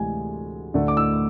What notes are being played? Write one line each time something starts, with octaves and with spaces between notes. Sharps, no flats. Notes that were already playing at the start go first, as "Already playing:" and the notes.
Already playing: D2 C3 E3 G#3 G#5
D2 D3 A3
D6
E6